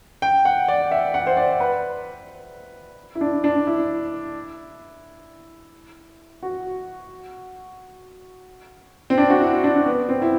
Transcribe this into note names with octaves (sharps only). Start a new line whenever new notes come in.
G5
F#5
D5
E5
F#5
C5
D5
B4
E4
D4
D4
E4
F#4
C4
D4
F#4
E4
D4
B3
C4
E4